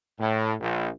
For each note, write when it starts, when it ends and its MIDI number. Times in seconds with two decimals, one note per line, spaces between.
0.18 0.53 45
0.60 0.89 34